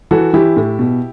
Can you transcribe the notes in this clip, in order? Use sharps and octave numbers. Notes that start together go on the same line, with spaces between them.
E3 F#4 A4
E3 E4 G4
A2
B2